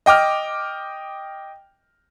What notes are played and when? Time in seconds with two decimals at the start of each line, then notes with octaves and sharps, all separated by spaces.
0.06 D#5 G5 D6 F6